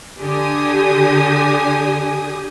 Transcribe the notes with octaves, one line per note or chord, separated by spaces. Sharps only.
D3 G4 G#5 D#6